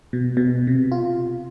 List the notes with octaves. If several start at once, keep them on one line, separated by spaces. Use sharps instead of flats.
B2
B2
C3
F4